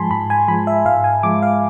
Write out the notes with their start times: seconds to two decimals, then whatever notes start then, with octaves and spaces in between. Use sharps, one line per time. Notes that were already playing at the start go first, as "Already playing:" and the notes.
Already playing: G#2 F3 G#3 G#5 A5 B5 C6
0.11 G#2 B5
0.30 G#5
0.48 F3 G#3 B5
0.67 E5
0.85 G#2 F5
1.04 G#5
1.23 F3 G#3 D6
1.42 F5